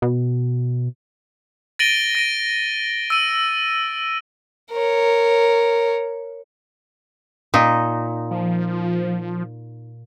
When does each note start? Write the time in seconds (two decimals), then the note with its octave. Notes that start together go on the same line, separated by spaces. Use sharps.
0.02 B2
1.79 A6 A#6 D7 D#7 F#7 G7
2.15 A#6 D7 D#7
3.10 E6 D#7
4.71 A#4 C#5
7.54 A#2 D#4
8.31 F3